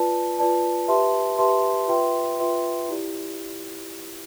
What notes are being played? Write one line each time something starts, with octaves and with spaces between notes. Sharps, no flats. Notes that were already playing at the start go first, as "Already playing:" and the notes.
Already playing: F4 B4 D5 A5
F4 B4 D5 A5
G4 B4 E5 A5 C6
G4 B4 E5 A5 C6
F4 B4 E5 G5 C6
F4 B4 E5 G5 C6
E4 G4 D5